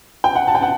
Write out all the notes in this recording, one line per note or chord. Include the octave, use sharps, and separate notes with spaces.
G5
F#5
A5
G5
F#5